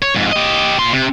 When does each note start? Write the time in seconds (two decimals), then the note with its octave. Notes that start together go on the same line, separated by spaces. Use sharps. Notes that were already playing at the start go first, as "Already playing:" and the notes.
0.02 C#5
0.15 F2 G#2
0.32 G4 D#5
0.79 A#2 C6
0.93 C3